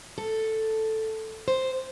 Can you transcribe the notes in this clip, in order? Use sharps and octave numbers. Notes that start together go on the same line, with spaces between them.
A4
C5